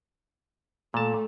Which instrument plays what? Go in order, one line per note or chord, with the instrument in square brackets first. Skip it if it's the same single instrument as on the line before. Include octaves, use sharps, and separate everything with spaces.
[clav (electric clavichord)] A#2 A5 [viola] A3